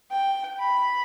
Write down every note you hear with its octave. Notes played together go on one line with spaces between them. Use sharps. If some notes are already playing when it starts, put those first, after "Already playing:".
G5
B5